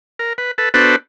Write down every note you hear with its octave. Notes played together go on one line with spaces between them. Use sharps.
A#4
B4
A4 B4
B3 D4 F#4 A4 B4 C5